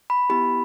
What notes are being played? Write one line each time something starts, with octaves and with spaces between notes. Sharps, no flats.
B5
B3 E4 G4 B5